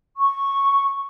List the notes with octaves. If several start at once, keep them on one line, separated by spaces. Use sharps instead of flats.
C#6